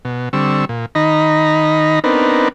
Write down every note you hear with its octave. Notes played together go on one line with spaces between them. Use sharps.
B2
D3 G3 C4 C#6 E6
A#2
D#3 D#4 D#5 A#5 B5
B3 C4 D4 D#4 A#4 B4